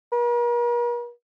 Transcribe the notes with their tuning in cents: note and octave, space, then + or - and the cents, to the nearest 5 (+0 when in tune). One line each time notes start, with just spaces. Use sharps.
A#4 +45